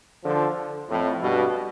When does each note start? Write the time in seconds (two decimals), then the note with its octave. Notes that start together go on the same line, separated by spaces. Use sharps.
0.24 D3 F3
0.88 F2 A2
1.21 G2 B2